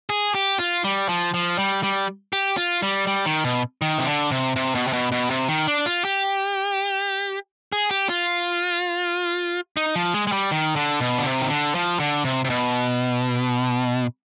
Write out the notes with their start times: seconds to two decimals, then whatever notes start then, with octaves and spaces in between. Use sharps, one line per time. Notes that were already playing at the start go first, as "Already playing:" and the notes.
0.10 G#4
0.35 G4
0.59 F4
0.84 G3
1.09 F3
1.34 F3
1.59 G3
1.83 G3
2.33 G4
2.57 F4
2.82 G3
3.07 G3
3.26 D#3
3.44 B2
3.82 D#3
3.98 C3
4.06 D3
4.31 C3
4.56 C3
4.75 B2
4.88 C3
4.93 B2
5.12 B2
5.30 C3
5.49 D#3
5.68 D4
5.86 F4
6.05 G4
7.72 G#4
7.91 G4
8.09 F4
9.77 D#4
9.95 F3
10.14 G#3
10.27 G#3
10.32 G3
10.51 D#3
10.76 D3
11.01 B2
11.18 D3
11.25 C3
11.42 D#3
11.50 D3
11.75 F3
12.00 D3
12.25 C3
12.44 C3
12.50 B2